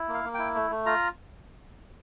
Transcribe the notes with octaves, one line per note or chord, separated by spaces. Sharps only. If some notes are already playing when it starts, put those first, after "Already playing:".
Already playing: E4
A#3
F5
A#3
E4 G5
A3
A3
F4 A#5